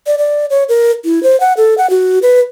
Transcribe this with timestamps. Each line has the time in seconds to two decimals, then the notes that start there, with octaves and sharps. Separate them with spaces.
0.07 D5
0.18 D5
0.50 C#5
0.69 A#4
1.05 E4
1.23 C5
1.40 F#5
1.57 A4
1.78 F#5
1.90 F#4
2.22 B4